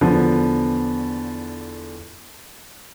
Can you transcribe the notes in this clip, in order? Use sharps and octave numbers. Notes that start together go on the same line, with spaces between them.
E2 D3 F3 B3